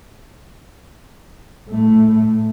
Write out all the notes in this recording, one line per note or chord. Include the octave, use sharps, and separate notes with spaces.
A2 A3